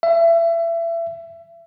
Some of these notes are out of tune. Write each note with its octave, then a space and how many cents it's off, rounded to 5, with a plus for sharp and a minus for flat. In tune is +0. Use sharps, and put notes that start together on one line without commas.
E5 +30